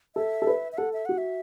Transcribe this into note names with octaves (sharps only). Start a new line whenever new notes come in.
A4 E5
A4
B4
E5
A4 F#5
E5
F#4 F#5
E5